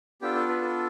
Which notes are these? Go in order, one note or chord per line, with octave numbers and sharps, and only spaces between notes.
B3 D4 F4 G4 A4 G5
A4
B4
A4